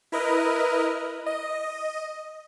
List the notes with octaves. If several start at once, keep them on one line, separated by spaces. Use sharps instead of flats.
E4 A#4 B4 D#5
D#5